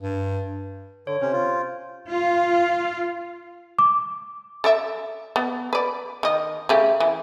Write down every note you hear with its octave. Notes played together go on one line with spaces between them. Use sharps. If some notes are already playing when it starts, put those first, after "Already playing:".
G2
D3 C#5
C3 C#4 C5
F4
F4 F5
D6
A4 D5 E5
B3
B4 D5
D#3 D#5
C#3 A3 G4
E3